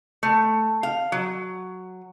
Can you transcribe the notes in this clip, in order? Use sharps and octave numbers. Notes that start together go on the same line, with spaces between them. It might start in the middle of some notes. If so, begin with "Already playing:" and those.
A3
F5
F#3